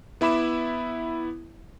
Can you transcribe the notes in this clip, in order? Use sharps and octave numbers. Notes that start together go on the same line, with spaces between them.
B3 E4 E5 B5 D6 E7